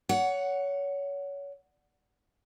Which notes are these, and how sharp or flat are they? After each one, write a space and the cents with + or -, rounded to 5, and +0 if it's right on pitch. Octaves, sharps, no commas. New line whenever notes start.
C#5 +25 F#5 +0